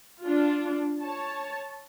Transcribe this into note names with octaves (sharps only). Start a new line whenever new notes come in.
D4 F4
C#5 A5